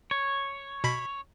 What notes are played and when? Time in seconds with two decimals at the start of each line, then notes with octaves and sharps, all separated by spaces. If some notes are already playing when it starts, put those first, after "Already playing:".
0.11 C#5
0.84 B2 B5 B6